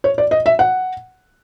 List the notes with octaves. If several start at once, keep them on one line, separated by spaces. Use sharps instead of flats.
C#5
D5
D#5
E5
F#5